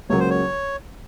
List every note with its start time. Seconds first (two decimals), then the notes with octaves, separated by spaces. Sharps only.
0.10 C#2 C#3 F#3 A#3 C#5
0.20 C5
0.30 C#5